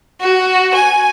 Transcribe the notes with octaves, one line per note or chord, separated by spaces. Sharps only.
F#4
G#5